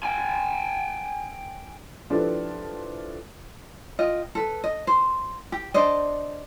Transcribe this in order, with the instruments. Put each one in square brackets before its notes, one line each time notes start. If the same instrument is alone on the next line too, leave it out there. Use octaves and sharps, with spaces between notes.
[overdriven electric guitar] G5 G#5
[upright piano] F3 D4 E4 G4 A4 B4
[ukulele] F4 D#5 G5
A4 B4
D#5
C5
G4
D4 C5 D5 D#5